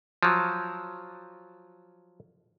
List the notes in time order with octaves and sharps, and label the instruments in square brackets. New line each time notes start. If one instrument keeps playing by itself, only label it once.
[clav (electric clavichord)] F3 F#3